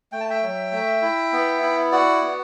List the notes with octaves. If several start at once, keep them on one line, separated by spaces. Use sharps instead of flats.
A3 G5
A5
E5 G5
F#3
A3
E4
B3
E4
F#4 D5 F#5
B3